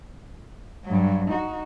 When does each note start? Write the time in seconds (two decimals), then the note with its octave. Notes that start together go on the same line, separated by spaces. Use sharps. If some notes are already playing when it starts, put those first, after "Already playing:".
0.85 G2 F#3
1.30 D#4 F#4